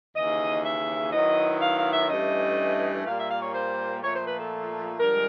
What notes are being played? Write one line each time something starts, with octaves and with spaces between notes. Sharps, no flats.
D#2 C#3 E3 D#5
E5
D#3 F#3 B3 E4 D#5
F5
F5
E5
G2 E3 A3 C#4 D#5
A#2 G3 A#3 F5
E5
F5
C#5
C5
A#2 F3 A3 C#5
C5
B4
A4
G2 D3 F3 G#3 A#4